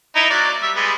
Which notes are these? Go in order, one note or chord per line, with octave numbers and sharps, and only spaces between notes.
D#4 E4
F#3 A#3 D5
G3 E5
G3 G#3 B3